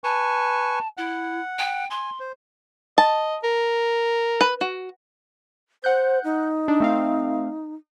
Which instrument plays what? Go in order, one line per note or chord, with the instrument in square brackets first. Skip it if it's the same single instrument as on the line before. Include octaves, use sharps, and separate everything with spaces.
[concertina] B4 G#5 C#6 [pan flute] A5
[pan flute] E4 [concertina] F#5
[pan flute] G5
[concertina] G#5 [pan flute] C6
[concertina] C5
[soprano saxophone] D#5 [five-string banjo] A5
[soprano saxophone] A#4
[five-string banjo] B4
F#4
[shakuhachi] C5 [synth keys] F#5 F#6 G6
[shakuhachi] D#4
[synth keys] D4
A3 C4 F5